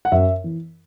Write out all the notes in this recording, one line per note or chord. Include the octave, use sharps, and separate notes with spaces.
F#5
F#2 E5
E3